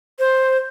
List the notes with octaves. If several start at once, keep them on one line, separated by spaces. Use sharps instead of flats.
C5